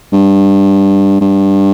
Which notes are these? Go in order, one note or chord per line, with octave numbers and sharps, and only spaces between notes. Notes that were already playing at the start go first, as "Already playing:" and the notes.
G2
G2